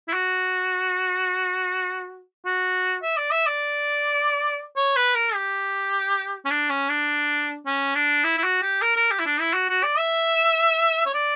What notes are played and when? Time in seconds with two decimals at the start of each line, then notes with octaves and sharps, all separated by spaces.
0.08 E4
0.13 F#4
2.45 F#4
3.02 E5
3.17 D5
3.31 E5
3.46 D5
4.76 C#5
4.96 B4
5.15 A#4
5.34 G4
6.45 C#4
6.50 D4
6.69 C#4
6.89 D4
7.66 C#4
7.95 D4
8.24 E4
8.37 E4
8.43 F#4
8.62 G4
8.82 A#4
8.96 A#4
9.11 G4
9.19 E4
9.26 D4
9.40 E4
9.54 F#4
9.69 F#4
9.83 D5
9.98 E5
11.06 C#5
11.14 D5